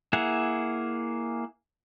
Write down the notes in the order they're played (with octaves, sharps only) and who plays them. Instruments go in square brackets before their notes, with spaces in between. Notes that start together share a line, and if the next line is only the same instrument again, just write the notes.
[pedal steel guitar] A#3 E4 G#4 F#5